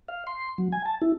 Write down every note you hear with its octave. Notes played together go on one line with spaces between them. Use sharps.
F5
C6
F#3
G#5
A5
E4